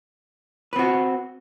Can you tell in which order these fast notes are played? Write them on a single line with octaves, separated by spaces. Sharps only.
B4 C4 F#4